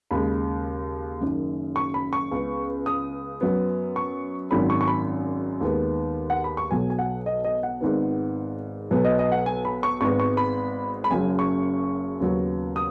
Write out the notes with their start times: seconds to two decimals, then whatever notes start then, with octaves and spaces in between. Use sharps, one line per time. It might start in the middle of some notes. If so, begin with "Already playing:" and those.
0.11 D#2 C#3 G#3 B5
1.21 F#1 F#2 D#3
1.76 C#6
1.94 B5
2.13 C#6
2.32 C#2 C#3 B3
2.86 D#6
3.41 F#2 F#3 B3
3.96 C#6
4.51 G#1 F#2 D#3 F#3 B5
4.70 C#6
4.81 C#6
4.88 B5
5.61 D#2 D#3 G#3 B3
6.30 F#5
6.44 B5
6.57 C#6
6.71 B1 B2 F#3 G#5
6.90 G#5
6.99 F#5
7.26 D#5
7.44 D#5
7.63 F#5
7.81 G#1 G#2 D#3 B3
8.91 B1 B2 F#3 B3
9.05 D#5
9.19 D#5
9.32 F#5
9.46 G#5
9.65 B5
9.83 C#6
10.01 G#1 G#2 G#3 B3 C#6
10.20 C#6
10.37 B5
11.04 B5
11.11 F#1 F#2 C#3 F#3 G#5
11.39 C#6
12.20 D#2 C#3 F#3 B3
12.76 D#6